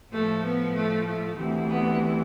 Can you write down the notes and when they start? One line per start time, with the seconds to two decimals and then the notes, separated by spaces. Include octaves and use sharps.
0.11 A2 F3 A3
0.42 B3
0.74 A3
1.05 A3
1.36 D2 C3 E3
1.69 B3